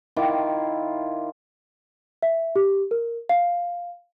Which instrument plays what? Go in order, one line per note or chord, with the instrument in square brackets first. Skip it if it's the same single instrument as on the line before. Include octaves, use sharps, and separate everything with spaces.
[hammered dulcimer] D#3 E4 F4 D6
[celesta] E5
G4
A#4
F5